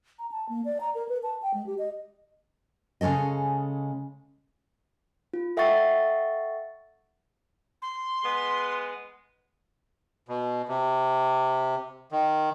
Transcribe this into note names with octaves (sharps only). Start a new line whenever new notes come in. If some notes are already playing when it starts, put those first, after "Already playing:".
A#5
A5
A#3
D5
A#5
A#4
B4
A5
G5
G#3
G4
D#5
C#3 G#3 C#4 A4 D#5
F4
A4 E5 F#5 G5 C#6 A6
C6
G#3 B3
B2
C3
D#3